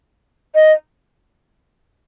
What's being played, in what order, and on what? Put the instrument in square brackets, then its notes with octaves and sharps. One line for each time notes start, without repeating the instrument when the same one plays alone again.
[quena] D#5